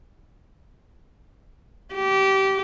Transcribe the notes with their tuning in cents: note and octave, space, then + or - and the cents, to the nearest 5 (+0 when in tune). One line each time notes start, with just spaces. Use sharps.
G4 -20